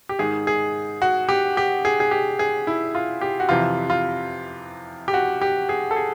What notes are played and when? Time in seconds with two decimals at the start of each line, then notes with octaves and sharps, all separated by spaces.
0.09 G4
0.19 G#2 D#3 G#4
0.47 G#4
1.02 F#4
1.29 G4
1.57 G4
1.85 G#4
2.00 G#4
2.11 G4
2.39 G#4
2.67 E4
2.95 F4
3.21 G4
3.40 F#4
3.49 F2 C3 E3 F4
3.90 F4
5.08 G4
5.14 F#4
5.41 G4
5.69 G#4
5.91 A4
5.96 G#4